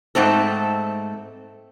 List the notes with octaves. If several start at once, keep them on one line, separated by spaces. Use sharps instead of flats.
G#2 A3 C4 A4